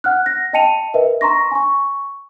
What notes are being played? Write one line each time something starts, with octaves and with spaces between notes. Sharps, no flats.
F#5 F6 F#6
A#6
D#5 G5 A5 C#7 D#7 F7
A#4 B4 D#5 E5
A#5 C6 C#6 A#6
G#5 C#6